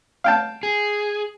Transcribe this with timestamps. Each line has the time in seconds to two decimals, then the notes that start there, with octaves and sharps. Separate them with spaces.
0.24 F5 G5 A5
0.63 G#4